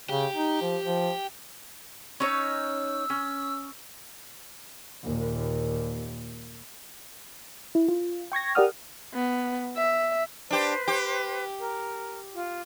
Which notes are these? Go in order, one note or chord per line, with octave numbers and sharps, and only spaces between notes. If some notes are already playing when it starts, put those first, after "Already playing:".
C#3 G4
D#4
F3
F3
C#4 D#4 C#5 E6
C#4
D#2 A#2
E4
F4
G5 C#6 G#6 A#6
G4 A#4 D5 F#5 D#6 F6
B3
E5
D4 G4 B4 C5
G4
A#4
F4